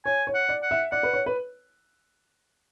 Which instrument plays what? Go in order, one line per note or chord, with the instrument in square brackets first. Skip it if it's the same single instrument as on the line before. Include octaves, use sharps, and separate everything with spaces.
[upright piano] C#5 [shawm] G#5
[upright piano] C#5
[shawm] F#5
[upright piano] D5
[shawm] F#5
[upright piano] E5
[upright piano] D5 [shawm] F#5
[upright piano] B4
C#5
B4